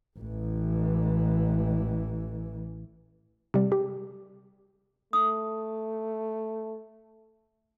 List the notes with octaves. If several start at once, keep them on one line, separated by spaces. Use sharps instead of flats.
A1 E3
C3 G3
G4
A3 D#6